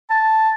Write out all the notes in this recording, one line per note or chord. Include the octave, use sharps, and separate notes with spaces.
A5